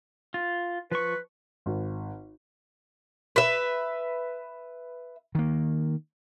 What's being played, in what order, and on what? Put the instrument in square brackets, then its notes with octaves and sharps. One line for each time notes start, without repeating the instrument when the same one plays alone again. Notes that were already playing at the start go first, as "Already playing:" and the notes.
[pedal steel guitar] F4
[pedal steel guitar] F3 C#6 [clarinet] B4
[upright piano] G#1
[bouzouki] B4 E5
[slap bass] D#3 A#3